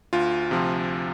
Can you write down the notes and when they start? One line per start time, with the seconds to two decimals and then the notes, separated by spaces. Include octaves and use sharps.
0.13 D2 F4
0.51 C3 F3